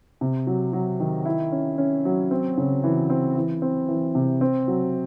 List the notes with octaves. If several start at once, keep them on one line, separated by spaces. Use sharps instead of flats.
C3
F#3
F#3
D#3
E4
C#4
C#4
F#3
C4
C#3
E3
C4
E3
C4
E3
C3
C4
F#3